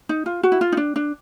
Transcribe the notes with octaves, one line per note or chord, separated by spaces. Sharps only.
D#4
F4
F#4
E4
F4
D#4
D4
D4